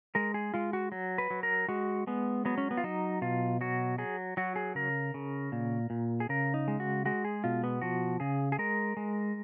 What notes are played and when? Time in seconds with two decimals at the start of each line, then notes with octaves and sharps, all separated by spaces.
0.15 G#3 A#4
0.34 G#4
0.54 G#3 F4
0.73 F#4
0.92 F#3
1.18 B4
1.30 F#3
1.43 A#4
1.69 G#3 F#4
2.07 G#3 B3
2.45 F#3 B3
2.58 C#4
2.71 B3
2.77 F4
2.84 F#3 D#4
3.22 B2 F4
3.61 F#3 F#4
3.98 F#3 G#4
4.37 F#3 F#4
4.56 G#4
4.75 C#3 A#4
5.14 C#3
5.52 A#2
5.90 A#2
6.20 G#4
6.29 C#3 A#4
6.54 D#4
6.68 G#3
6.80 F#4
7.06 G#3 F#4
7.25 G#4
7.44 B2 F4
7.64 B3
7.82 F3 F#4
8.20 C#3 G#4
8.52 G#4
8.59 G#3 A#4
8.97 G#3